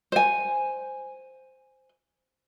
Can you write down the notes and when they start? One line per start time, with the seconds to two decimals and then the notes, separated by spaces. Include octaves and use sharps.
0.12 C5 G#5